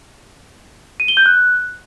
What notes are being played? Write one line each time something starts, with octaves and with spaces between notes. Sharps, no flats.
D#7
G7
G6
F#6